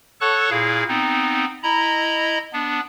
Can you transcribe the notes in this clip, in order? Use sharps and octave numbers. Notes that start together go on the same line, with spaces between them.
A4 C#5 F#5 A5 C#6 F#6
A#2 E4 G#4 F5
B3 C4 D#4
E4 D#5 A#5 B5
B3 D4